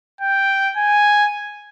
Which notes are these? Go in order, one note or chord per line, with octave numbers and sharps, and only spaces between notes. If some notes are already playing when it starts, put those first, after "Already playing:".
G5
G#5